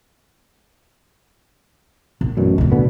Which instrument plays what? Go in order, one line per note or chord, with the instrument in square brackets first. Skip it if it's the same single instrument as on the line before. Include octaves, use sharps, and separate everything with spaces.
[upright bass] A#1
[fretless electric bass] A1 F#2 B2
[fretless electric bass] F1 [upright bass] A2 C#3
[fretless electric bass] B2 D3 B3